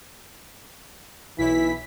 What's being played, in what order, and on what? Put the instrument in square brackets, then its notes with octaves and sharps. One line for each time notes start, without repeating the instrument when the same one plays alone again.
[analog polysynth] B1 E4 B6 [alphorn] E3